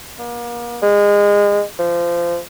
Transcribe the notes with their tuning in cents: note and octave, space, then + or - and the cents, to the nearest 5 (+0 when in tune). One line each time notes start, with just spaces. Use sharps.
A#3 +40
G#3 -25
F3 -25